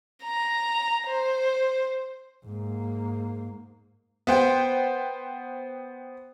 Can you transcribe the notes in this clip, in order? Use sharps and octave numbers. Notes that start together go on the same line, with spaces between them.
A#5
C5
G#2 A#3
B3 C5 G5